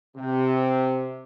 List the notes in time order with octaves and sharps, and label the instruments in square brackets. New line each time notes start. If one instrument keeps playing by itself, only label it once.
[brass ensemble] C3